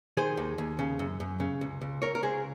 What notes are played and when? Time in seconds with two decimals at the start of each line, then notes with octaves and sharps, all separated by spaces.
0.17 D#3 G#4 C5
0.37 D#2
0.58 D#2
0.79 C#3
0.99 F#2
1.20 F#2
1.40 C#3
1.61 C#2
1.81 C#2
2.02 C#2 A#4 C#5
2.15 A#4
2.23 C#2 G#4 C5